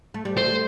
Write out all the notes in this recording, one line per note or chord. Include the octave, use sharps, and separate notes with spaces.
A3
G3
A3 C5